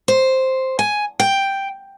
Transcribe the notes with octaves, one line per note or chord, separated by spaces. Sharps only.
C5
G#5
G5